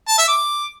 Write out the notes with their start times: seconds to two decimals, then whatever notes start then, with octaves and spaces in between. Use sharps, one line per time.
0.08 A5
0.18 E5
0.28 D6